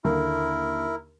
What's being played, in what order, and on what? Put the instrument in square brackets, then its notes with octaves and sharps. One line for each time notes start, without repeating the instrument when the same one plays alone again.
[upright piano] D#2 D3 A#3 [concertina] E4 A#4